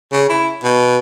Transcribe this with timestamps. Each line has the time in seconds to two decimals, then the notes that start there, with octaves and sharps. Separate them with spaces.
0.12 C#3
0.29 E4
0.63 B2